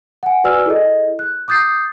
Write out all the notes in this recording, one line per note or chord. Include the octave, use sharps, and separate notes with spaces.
F#5 G#5
F#4 B4 D5 G#5 E6 F6
E4 G#4 A4 D#5
F#6
D6 D#6 G6 A6 C7